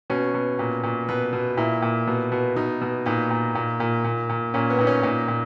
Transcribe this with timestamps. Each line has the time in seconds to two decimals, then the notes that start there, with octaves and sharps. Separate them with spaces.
0.10 B2 C#4
0.34 B2
0.59 A#2
0.83 A#2
1.09 B2 B4
1.33 B2
1.57 A#2 E4
1.82 A#2
2.07 B2
2.32 B2
2.56 B2 D#4
2.81 B2
3.06 A#2 D#4
3.30 A#2
3.55 A#2
3.80 A#2
4.04 A#2
4.29 A#2
4.54 A#2 C#4
4.70 B3
4.79 A#2 D#4
4.87 C#4
5.03 A#2 D#4
5.28 A#2